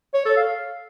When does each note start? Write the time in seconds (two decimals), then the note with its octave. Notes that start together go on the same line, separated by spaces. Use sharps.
0.14 C#5
0.26 A4
0.37 F5